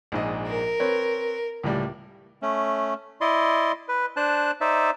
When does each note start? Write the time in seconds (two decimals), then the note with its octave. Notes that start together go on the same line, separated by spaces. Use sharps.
0.12 A#1 G#2 D#5
0.47 A#4
0.80 C4 B4 C#5
1.63 C#2 A2 G3
2.42 A3 C#4
3.21 E4 D5 D#5 C6
3.89 B4
4.16 D4 C5 A5 F#6
4.61 D#4 C5 D5 E5